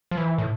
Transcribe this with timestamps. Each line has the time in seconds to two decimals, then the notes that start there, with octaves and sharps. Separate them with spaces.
0.11 F3
0.17 E3
0.38 A2